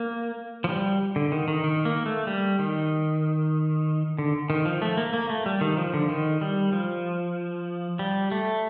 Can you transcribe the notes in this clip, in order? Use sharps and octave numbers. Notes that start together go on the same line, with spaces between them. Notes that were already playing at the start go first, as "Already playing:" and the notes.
Already playing: A#3
F3
G3
D3
D#3
D#3
D#3
A#3
A3
G3
D#3
D3
D#3
F3
A3
A#3
A#3
A3
G3
D#3
F3
D3
D#3
G3
F3
G3
A3